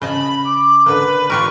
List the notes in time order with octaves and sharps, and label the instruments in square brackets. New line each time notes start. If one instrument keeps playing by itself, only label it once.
[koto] C#3 D#5 A5 [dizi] B5
[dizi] D6
[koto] D3 A#3 [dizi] B4
[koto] F4 G4 A#4 [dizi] C#6